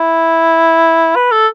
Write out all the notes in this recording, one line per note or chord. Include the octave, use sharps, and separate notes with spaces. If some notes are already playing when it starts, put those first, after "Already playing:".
Already playing: E4
B4
A4